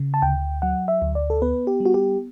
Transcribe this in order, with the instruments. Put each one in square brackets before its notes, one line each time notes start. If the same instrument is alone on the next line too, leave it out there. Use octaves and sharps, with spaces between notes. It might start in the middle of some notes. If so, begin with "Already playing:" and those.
Already playing: [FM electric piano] C#3
A5
D2 G5
F#3 F#5
E5
D2
D5
A4
B3 B4
G4
G3
F#4
G4